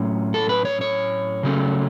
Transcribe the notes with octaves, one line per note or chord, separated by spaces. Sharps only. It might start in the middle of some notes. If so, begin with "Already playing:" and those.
Already playing: A2 F#3 C#4
A4
B4
C#5
C#5
C#3 F#3 A3 C#4